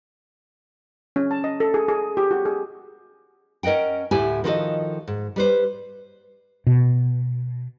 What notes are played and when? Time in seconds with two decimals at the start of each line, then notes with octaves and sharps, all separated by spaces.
1.16 C#4
1.31 A5
1.44 D#5
1.60 A4
1.74 G#4
1.88 G#4
2.17 G4
2.31 F#4
2.46 G#4
3.63 C#4 A#4 D#5 F#5 G5
4.11 D2 A2 E4 G4 G#5
4.44 D#3 F3 F4 F#4 A4 D#5
5.07 G#2
5.36 G3 B4 C5
6.67 B2